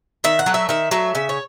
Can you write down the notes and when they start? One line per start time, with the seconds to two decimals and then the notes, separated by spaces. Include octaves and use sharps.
0.24 D#3 E5
0.39 F#5
0.46 F#3 A3
0.54 E5
0.69 D#3 E5
0.91 F#3 A3 E5
1.15 C#3 E5
1.29 C#5